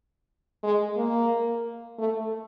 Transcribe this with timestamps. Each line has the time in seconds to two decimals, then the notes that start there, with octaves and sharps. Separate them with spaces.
0.63 G#3
0.97 A#3
1.98 A3